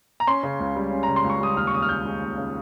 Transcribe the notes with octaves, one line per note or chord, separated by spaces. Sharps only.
A#5
C#4 C6
C#3
C#2
G3
C#4
C#3 A#5
C6
C#2
C#6
G3 D#6
D#2 F6
C#6
C#3 D#6
F6
D#2 G6
G#3
D#2
C#3